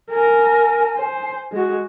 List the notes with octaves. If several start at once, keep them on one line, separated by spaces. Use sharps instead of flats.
A#4 G#5
C5
G#3 F#4